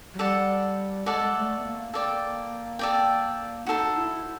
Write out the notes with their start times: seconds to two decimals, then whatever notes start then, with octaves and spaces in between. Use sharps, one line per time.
0.14 F#3
0.19 G3 A4 D5 F#5
1.06 G#3 A4 D5 F#5
1.35 A3
1.59 B3
1.64 A#3
1.94 A4 D5 G5
2.79 A4 D5 G5
3.67 D#4 F#4 A4 C5
3.96 E4